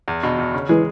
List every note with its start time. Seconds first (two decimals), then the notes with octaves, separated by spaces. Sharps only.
0.08 E2
0.23 B2
0.38 E2
0.54 C#3
0.69 E3 G#3